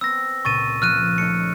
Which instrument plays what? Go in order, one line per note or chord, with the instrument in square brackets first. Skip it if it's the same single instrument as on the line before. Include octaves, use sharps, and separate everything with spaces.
[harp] B3 C4 [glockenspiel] E6 A#6
[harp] C#2 A#2 [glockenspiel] C#6 A6 D#7
[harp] F3 [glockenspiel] F6 F#6 D#7
[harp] A3 C#4 D#4 [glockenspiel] C#7